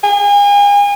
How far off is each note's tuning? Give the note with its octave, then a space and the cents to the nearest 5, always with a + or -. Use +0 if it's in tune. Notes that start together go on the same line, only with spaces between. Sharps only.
G#5 -40